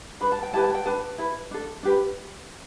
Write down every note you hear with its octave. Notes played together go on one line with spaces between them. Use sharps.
D4 B4 B5
A5
G5
E4 G4 B4 A5
A5
G5
D4 B4 A5
E4 B4
D4 A4
D4 G4 B4